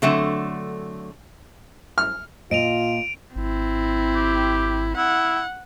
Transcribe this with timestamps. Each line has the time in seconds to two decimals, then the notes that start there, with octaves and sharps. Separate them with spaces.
0.02 D3 F#3 A3 C4
1.98 F6
2.51 A#2 F4 D#5 D7 D#7 F7
3.36 G#1 C4 E4
4.15 G4
4.97 E4 F#5